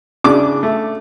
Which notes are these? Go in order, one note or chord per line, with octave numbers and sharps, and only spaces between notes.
C#3 D4 D6
A3